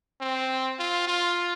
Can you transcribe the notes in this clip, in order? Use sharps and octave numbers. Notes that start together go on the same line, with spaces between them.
C4
F4
F4